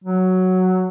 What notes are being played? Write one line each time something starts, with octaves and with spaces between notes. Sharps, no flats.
F#3